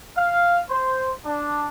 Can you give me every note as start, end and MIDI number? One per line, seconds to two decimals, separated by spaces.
0.17 0.59 77
0.69 1.10 72
1.25 1.67 62